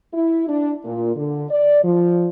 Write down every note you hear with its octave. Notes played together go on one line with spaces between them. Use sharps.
E4
D4
A#2
D3
D5
F3